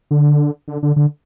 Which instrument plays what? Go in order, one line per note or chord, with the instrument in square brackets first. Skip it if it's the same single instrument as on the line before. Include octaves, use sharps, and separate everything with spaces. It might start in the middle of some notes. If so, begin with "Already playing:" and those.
[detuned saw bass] D3
D3
D3
D3